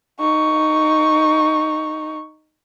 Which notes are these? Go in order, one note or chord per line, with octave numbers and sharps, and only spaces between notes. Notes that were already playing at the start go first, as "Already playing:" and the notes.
D#4 C#6